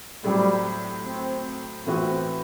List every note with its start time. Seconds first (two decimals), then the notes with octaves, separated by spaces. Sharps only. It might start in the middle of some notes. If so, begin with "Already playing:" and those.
0.24 A2 F#3 G3 C4
1.05 C4
1.86 A2 E3 B3 C4 F#4 B4